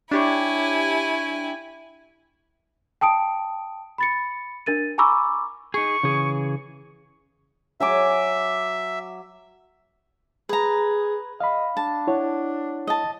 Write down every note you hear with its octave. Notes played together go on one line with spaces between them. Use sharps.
D4 E4 G4 C#5 G#5
G5 A5 D#6 D7
B5 A6 C#7
D4 A#4 A6 D#7
G#5 A#5 B5 C#6 D6 E6
D#4 G#4 C#6
C#3 E3 G#4
F#3 E5 G#5 D6
G#4 B4 A#5
D#5 F5 B5
D4 A5
E4 C#5 F#5
D#5 A5